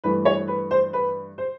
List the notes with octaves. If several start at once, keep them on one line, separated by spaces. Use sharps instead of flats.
G2 E3 A3 B4
C#5
B4
C5
B4
C5